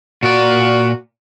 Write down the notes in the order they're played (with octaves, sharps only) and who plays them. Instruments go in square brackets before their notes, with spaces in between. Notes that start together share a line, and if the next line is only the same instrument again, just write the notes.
[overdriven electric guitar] A#2 D5 [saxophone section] F#4